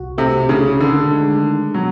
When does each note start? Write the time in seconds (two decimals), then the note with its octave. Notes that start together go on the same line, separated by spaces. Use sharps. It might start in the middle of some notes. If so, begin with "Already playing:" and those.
Already playing: C2 F#4
0.18 C3 A3
0.49 C#3 A3
0.80 D3 D#3
1.11 G#3
1.43 D#3
1.74 B2 F#3